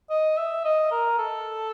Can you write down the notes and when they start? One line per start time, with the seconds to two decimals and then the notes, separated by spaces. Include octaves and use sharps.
0.10 D#5
0.37 E5
0.65 D#5
0.91 A#4
1.18 A4